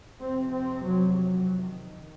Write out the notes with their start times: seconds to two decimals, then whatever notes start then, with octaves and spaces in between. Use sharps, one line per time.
0.20 F2 C3 C4
0.52 C4
0.84 F#3
1.15 F#3
1.62 D#3